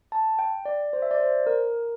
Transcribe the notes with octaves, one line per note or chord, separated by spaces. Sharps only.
A5
G5
D5
C5
E5
D5
C5
A#4